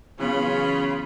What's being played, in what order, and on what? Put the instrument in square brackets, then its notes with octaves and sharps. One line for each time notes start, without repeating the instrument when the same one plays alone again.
[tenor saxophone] C#3 [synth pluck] E3 F#3 B3 [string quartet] C#4 F4 B5